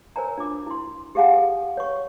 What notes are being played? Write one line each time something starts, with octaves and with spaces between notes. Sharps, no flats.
A#4 C5 C#5 G#5 A#5
D4 F4 D6
E4 C6
G4 G#4 F5 F#5 G#5
A4
C#5 C#6